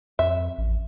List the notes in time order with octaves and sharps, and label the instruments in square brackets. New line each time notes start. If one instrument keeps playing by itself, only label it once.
[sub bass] F2 [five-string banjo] E5
[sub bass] A1